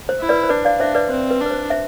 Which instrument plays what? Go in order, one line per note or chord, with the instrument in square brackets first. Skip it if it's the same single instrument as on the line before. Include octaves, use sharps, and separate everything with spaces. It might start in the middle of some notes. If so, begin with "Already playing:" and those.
[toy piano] C5
[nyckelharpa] E4
[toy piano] B4 D5
C5
[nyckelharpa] D4 [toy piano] B4 D5
[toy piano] D5 F5
[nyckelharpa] D4 [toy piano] C5 E5
[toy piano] B4 D5
[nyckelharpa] C4 [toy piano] C5
[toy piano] B4
[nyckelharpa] D4
[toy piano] B4
C5
C5 E5